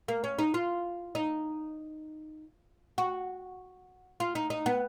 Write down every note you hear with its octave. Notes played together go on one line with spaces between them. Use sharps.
A#3
C#4
D#4
F4
D#4
F#4
F4
D#4
D#4
B3